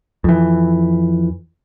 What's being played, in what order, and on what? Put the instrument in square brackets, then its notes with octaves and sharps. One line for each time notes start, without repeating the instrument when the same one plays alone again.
[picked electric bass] F2 E3